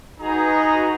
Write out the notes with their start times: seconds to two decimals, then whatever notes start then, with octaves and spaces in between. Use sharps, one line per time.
0.20 D#4 F#4 G#4 B4 A#5